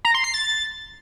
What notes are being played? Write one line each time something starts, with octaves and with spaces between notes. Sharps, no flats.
A#5
C6
C7
A6